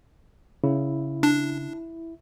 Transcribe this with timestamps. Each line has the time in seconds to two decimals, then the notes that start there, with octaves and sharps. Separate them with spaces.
0.64 C#3 E4
1.23 D4